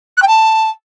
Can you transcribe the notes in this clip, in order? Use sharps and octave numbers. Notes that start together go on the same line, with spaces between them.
F#6
G5
A5